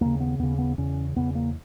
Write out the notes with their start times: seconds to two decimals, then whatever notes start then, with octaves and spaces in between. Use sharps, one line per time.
0.01 D#2 C#3 A#3
0.20 B3
0.39 D#2 C#3 B3
0.58 B3
0.78 E2 C#3 C#4
1.16 E2 C#3 B3
1.35 A#3